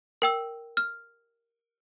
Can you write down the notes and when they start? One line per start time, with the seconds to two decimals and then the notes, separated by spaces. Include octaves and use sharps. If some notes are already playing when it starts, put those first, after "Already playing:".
0.22 A#4 G5 E6
0.77 F6